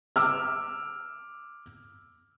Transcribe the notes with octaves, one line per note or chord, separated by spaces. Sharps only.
D6 E6 F6